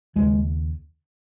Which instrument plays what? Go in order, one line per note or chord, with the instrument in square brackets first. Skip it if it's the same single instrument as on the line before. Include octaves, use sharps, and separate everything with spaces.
[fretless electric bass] D#2 C#3 G#3